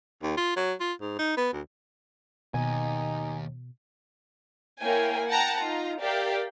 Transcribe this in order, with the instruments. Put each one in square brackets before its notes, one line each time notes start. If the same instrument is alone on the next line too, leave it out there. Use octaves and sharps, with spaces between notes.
[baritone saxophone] D#2
F4
F#3
F4
G#2
D#4
B3
D2
[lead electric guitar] D#2 [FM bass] B2 [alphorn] D#4 [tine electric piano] G#5
[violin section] A#3 E4 A#4 C#5 G5 G#5
F#5 G5 A5 A#5
D#4 F4 A#5
G4 A#4 D5 E5 F5 G5